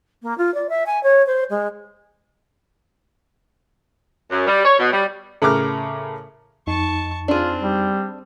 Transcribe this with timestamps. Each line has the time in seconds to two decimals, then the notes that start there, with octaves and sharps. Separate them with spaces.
0.22 A#3
0.38 F4
0.54 D5
0.69 E5
0.86 G#5
1.03 C#5
1.27 C5
1.50 G#3
4.31 F#2
4.47 G3
4.64 C#5
4.79 B2
4.92 G3
5.42 A2 C#3 A#4 D6 F6
6.67 F2 D#4 A5 C#6
7.28 C4 D4 F4 G#4
7.62 G3